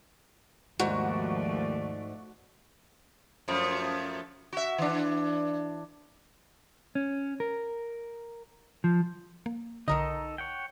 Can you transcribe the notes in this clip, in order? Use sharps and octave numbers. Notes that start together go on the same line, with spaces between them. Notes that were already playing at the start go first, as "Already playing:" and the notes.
D#2 G#2 F3 A3 F#4 D5
F#2 F3 A3
F#4 E5
E3 D4
C#4
A#4
F3
A#3
B1 D3 D#3 D#4 A4 A#4 D#5
C#5 F#5 G5